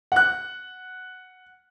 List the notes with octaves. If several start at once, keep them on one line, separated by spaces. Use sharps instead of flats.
F#5 F#6